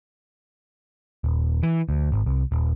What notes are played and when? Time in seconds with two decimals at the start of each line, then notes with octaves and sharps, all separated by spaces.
1.24 D#1
1.63 E3
1.89 D2
2.12 G#1
2.26 C2
2.52 D#1